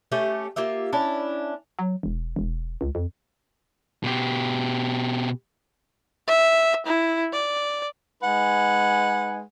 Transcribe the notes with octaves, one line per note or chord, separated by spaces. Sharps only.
A3 C#4 G4
A#3 F4 G4 E5
C#4 D4 E4
F#3
E1
E1
C#2
F2
B2 G4
E5
E4
D5
G#3 D#4 B4 F#5 G#5